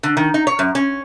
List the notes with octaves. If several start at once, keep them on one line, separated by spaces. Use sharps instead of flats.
D3
D#3
D#4
C#5
F#2
C#4